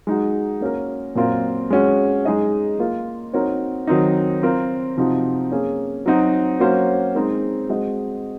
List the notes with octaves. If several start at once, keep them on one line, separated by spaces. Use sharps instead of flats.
G#3 D#4 F#4
A#3 C#4 F#4 A#4
A#2 F#3 C4 F4 A#4
G#3 C#4 F#4
G#3 D#4 G#4 D#5
A#3 F4 A#4
C4 D#4 F#4 A#4 C#5
D#3 F#3 C4 D#4
C4 F4 A#4
C3 F3 C4 D#4 F#4
A#3 C#4 G#4
F#3 C4 D#4 F#4
F#3 A#3 C#4 F#4 C5
G#3 C4 D#4 A#4
G#3 C4 F#4 C5 D#5